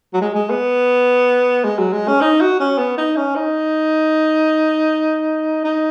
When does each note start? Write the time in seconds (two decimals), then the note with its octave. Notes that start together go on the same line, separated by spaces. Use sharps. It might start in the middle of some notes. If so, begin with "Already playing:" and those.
0.13 F#3
0.21 G#3
0.35 G#3
0.50 B3
1.64 G#3
1.78 F#3
1.93 G#3
2.08 C#4
2.21 D#4
2.41 F#4
2.60 C#4
2.78 B3
2.98 D#4
3.16 C#4
3.35 D#4
5.64 D#4